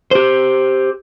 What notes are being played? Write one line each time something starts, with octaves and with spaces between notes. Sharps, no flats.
G4 C5